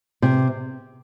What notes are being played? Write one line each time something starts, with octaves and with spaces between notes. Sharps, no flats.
C3